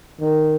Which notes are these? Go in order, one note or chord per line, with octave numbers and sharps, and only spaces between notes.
D#3